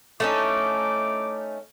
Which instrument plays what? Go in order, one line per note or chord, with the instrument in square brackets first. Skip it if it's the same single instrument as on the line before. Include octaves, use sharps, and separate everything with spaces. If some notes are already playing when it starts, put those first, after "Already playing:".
[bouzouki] A3 C#4 D#4 [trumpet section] E4 D6